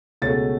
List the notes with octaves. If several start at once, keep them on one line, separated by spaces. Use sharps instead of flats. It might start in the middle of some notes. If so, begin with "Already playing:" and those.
C#2 B2 A3 C#4 A6